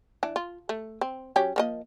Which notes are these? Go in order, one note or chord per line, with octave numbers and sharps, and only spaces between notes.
E3 D4
F4
A3
C4
F#3 C#4 G4
F3 A#3 D#5